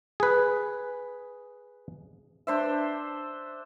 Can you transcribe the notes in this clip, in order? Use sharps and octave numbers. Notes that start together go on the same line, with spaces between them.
G#4 B4
D4 C5 E5